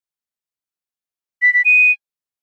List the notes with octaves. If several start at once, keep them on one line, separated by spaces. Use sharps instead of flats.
B6
B6
D#7